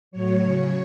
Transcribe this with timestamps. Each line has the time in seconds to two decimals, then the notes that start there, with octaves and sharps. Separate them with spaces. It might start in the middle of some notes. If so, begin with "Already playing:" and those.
0.11 A2 F#3 C#5
0.41 C#3 F#3